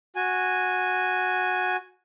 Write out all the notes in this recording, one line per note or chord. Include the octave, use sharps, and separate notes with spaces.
F#4 G#5